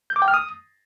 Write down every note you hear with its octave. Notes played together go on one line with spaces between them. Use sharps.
G6
D6
G5
F6
D#6